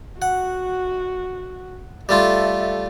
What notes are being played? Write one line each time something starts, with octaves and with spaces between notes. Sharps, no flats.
F#4 F#5
G3 A3 F4 A4 E5